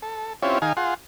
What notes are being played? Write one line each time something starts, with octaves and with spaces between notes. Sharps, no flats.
A4
C4 C#4 E4 F4 G4 C#5
D#3 D#4 G#4 F5 G#5
F4 G#4 F#5 C6